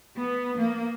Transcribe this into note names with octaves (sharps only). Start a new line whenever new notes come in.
B3
A#3